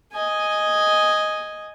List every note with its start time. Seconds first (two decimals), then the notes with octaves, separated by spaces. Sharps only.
0.13 D#5 G#5